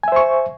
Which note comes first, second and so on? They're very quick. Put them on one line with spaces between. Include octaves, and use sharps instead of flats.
G#5 E5 C5 C#6